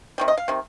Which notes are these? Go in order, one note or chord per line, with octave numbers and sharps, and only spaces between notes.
C3 D#3 G3
D#5
F5
C3 D#3